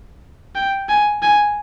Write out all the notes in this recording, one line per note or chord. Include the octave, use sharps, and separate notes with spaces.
G5
G#5
G#5